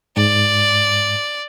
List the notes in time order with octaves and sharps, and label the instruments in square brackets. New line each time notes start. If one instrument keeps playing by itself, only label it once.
[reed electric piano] G#2 [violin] D5